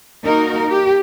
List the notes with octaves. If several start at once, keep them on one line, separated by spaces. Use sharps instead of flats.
A#3 D#4 F#4 A#4
G4